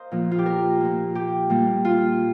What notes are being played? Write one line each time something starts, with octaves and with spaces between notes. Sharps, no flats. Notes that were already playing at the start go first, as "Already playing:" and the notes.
Already playing: A#4 C5 D#5 F5
A#2 F3 A#3
F4
G4
A#4
A#2 A#3
G4
A#2 G3 A#3
F4